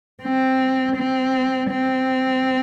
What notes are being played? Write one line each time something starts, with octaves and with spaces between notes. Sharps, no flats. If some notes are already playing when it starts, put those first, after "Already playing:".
C4
C4
C4